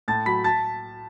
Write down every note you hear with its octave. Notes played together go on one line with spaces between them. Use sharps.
A2 A5 A6
F#3 B5 B6
A5 A6